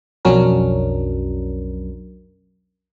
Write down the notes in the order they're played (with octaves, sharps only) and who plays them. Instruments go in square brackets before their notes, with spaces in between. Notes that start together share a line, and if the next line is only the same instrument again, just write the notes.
[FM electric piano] B1 F2 F#3 C#4 D4 A#4